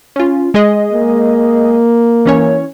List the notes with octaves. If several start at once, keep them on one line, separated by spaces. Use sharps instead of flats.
C#4 F4
G#3 G#4 D#5
A#3
E3 C#4 C#5